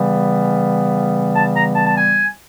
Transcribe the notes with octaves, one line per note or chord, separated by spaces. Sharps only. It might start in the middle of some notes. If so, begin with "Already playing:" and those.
Already playing: C#3 E3 G3 B3
A5
A#5
A5
A5
G#5